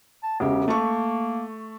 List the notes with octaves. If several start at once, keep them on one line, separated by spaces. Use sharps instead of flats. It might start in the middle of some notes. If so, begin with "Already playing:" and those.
A5
E1 C#3 G4
A3 A#3 C#6